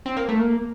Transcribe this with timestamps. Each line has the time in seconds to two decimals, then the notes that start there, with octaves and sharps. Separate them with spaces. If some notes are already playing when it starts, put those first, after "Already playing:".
0.06 C4
0.17 A#3
0.29 A3
0.39 A#3